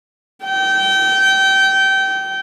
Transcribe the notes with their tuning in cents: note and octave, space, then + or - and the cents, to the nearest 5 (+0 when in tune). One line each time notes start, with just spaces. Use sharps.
G5 -25